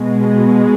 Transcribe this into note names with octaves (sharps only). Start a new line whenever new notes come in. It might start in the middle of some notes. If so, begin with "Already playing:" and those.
Already playing: B2 G#3